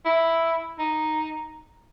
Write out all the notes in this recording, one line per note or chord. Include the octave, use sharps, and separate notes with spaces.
E4
D#4